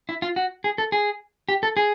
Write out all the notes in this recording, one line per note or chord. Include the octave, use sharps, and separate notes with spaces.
E4
F4
F#4
G#4
A4
G#4
G4
A4
G#4